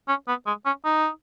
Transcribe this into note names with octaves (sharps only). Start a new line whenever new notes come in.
C#4
B3
G#3
C#4
D#4